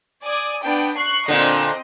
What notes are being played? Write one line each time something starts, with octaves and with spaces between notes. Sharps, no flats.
D5 G#5 D#6
B3 D4 G5
C#6 F#6 C7
A#2 D3 C4 D#5